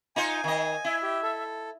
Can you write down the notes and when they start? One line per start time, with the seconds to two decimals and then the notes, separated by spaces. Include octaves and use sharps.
0.16 D#4 F4 C5 G#5
0.44 D#3 D#5
0.85 E4 E5
1.03 G4
1.23 A4